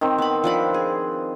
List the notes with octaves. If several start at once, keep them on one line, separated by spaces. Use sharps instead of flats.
D#3 C4
B3 B5
F3 D4 B5
G#4